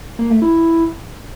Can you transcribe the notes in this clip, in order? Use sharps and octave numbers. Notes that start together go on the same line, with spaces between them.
A#3
A3
E4